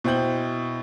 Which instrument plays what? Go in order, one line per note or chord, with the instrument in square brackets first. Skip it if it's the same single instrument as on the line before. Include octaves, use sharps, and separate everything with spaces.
[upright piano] B2 E4 C5 G5 G6 F#7